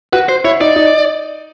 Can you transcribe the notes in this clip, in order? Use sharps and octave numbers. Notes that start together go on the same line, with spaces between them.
F#4 B4
C5
E4 C#5
D#4 D5
D#4